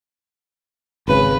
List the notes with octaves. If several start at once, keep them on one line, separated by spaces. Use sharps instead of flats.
G#1 C#3 B4